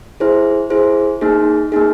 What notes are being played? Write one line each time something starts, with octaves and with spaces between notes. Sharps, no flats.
E4 G#4 C5
E4 G#4 C5
A#3 D#4 G#4
A#3 D#4 G#4